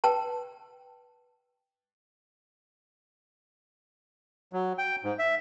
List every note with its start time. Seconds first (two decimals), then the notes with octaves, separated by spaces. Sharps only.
0.04 B4 G5 A5
4.53 F#3
4.78 G5
5.04 G#2
5.19 E5